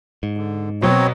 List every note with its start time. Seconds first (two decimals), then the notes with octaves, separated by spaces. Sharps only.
0.23 G#2
0.37 D3
0.82 B2 F#3 B3 C4 C#5